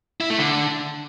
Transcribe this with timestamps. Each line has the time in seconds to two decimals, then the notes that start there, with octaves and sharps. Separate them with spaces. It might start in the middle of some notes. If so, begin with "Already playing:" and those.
0.21 E4
0.30 A3
0.39 D3